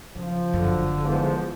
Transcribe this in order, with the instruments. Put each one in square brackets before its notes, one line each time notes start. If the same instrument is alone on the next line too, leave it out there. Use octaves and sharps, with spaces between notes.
[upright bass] C#3 [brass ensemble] F3
[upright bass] F#1 F#2 [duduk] D3
[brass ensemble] E2 G#2 F3